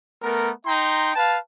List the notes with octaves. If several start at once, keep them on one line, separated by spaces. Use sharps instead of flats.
A3 B3 A#4
D#4 G5 A#5 C6
B4 F5 A5